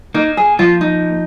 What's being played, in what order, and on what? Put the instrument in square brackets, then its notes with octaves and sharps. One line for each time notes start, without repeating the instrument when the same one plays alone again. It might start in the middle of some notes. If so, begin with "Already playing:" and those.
[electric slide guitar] A#3 [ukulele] D#4
[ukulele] G#4
[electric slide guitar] F3 [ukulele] F4
[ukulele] D#4